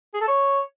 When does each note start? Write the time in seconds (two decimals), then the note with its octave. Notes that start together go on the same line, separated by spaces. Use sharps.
0.14 G#4
0.21 A4
0.28 C#5